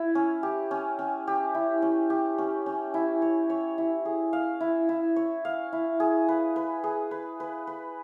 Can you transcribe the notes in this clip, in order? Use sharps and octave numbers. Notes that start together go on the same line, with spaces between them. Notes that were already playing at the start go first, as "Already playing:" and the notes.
Already playing: E4
C#4
G4
C#4
C#4
G4
E4
C#4
G4
C#4
C#4
E4
C#5
C#5
E4
G#4
F5
E4
E4
C#5
F5
E4
G#4
B4
B4
G#4
B4
B4
B4